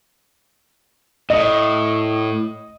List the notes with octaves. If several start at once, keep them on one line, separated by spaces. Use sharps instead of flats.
A2 D#5 D#6